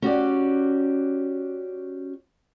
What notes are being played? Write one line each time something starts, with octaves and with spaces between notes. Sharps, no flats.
C#4 F#4 G4 D5